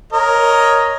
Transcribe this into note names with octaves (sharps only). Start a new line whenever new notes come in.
A#4 C#5 D#5